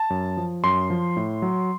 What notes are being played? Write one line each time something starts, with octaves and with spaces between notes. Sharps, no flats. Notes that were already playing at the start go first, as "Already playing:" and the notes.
Already playing: A5
F#2
F3
F#2 C6
F3
A2
F#3